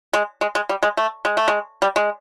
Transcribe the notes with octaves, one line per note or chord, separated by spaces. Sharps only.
G#3
G#3
G#3
G3
G#3
A3
G#3
A3
G#3
G3
G#3